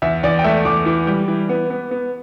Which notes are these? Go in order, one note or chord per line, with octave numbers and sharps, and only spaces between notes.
E2 E5
E2 D5
G5
A3 E5
E2 D6
E3
G3
E3
B3
B3
B3